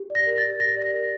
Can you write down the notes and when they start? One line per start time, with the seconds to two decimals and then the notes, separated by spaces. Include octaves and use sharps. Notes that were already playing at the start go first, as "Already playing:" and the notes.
Already playing: G4
0.10 D5
0.15 A#6
0.26 A#4
0.38 A6
0.43 G4
0.60 G4 A#6
0.76 D5
0.82 A#6
0.94 A#4